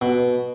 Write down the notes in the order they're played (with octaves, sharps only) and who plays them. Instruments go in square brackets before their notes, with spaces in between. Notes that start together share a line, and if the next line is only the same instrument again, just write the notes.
[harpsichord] B2